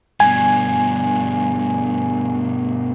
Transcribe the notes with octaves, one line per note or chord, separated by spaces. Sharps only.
G2 B2 G#5